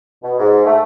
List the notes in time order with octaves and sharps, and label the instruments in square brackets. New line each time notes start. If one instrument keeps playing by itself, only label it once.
[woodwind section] B2
G#2
A3